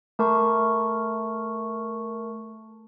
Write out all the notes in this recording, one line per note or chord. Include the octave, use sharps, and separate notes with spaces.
A3 A#4 A5 C#6